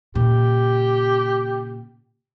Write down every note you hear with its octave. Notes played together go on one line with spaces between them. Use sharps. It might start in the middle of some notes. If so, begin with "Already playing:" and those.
A#2 C#3 G4